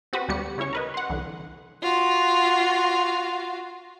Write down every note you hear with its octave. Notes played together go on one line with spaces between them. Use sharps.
C4 F#4 G4 B4
D2 G3 B3 F#4 G4 C#7
C#3 C#4 E4 C#5 C#6
A#4 B4 D#5
F#5 C6
C2 D3 E3
F4 F#4